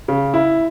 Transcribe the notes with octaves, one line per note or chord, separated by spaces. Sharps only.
C#3
E4